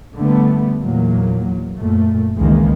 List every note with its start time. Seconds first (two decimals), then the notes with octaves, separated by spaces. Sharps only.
0.15 D3 G3 A3 B3
0.80 E2 A#2 F#3 A#3
1.79 F#2 A#2 A3
2.37 C#2 D#3 E3 G#3 A#3